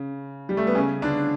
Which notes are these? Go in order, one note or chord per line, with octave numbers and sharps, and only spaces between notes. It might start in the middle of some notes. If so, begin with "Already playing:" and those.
Already playing: C#3
G3
A3
B3
C#3 C#4
D3 D4